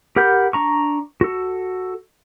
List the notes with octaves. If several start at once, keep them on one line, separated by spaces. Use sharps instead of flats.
G4 A#4 F#5 B5 G6
D4 A#5 C#6
F#4 A4